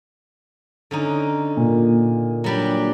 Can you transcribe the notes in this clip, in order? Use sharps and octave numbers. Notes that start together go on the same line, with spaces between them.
D3 C#4 D#4
A#2
F#3 G3 D4